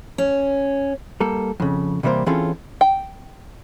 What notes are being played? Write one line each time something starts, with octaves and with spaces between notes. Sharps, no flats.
C#4
G3 A#3 A4
F2 C#3
C3 E3 G3 A#3 C5
E3 C4 C#4 F4 G#4 A4
G5